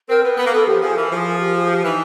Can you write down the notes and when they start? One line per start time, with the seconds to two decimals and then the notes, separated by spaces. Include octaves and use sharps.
0.09 C4 A#4
0.23 B3 B4
0.38 B3 B4
0.46 A#3
0.52 B3 A4
0.66 F3 G4
0.81 F3 G#4
0.96 E3 A#4
1.10 F3 G#4
1.25 G#4
1.39 G4
1.55 G#4
1.69 G4
1.83 E3 D#4